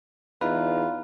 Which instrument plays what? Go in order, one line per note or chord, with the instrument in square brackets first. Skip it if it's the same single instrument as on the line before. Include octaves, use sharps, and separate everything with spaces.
[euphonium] E2 [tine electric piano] D#4 B4 [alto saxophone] F4